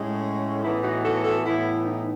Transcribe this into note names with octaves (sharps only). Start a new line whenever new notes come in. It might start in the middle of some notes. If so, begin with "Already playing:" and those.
Already playing: A2 G#3 C#4
A2 E3 B3 D#4 E4
D#4 F#4
F#4 A4
F#4 A4
A2 E3 B3 E4
D#4